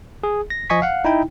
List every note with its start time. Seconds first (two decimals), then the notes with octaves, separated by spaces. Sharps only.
0.23 G#4
0.50 A#6
0.70 F3 D#5 G#5 C#6 B6
0.82 F5 F#5
1.05 D#4 E4 G5